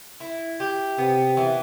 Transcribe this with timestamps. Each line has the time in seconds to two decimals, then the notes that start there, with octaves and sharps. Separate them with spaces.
0.20 E4
0.60 G4
0.98 C3 B3
1.37 E3